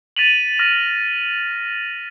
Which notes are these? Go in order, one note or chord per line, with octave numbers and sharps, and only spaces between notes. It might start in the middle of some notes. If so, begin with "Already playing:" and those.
A6 B6 D#7 F7 F#7
F6 A#6 D#7